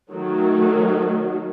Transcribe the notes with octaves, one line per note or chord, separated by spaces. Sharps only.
D#3 F#3 A3